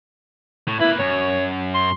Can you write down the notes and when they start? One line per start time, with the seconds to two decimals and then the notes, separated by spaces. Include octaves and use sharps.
0.67 A2
0.80 A#3 E4 B4
0.99 F#2 C#5
1.74 C6